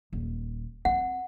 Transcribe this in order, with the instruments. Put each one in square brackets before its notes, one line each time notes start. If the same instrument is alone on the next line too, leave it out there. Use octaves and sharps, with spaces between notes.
[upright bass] D#1
[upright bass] C4 [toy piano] F#5